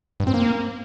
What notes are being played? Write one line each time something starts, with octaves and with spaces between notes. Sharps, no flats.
G2
C4
A#3